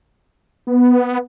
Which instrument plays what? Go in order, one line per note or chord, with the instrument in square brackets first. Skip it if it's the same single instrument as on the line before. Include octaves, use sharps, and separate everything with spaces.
[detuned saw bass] B3